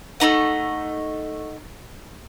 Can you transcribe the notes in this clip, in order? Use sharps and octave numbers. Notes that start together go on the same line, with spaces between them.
A3 A#3 D#4 F#5